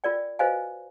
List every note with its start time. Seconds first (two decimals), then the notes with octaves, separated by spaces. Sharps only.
0.04 F4 A#4 D5 G5
0.39 F#4 B4 C5 D#5 F5 G#5